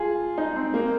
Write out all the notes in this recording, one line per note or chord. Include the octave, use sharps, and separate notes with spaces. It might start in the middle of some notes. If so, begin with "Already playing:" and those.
Already playing: F4 G#4
D#4
C4
A#3